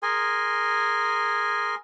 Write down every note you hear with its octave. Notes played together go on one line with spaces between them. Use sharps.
G#4 A#4 G#5 C6